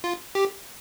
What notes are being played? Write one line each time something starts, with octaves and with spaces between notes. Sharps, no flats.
F4
G4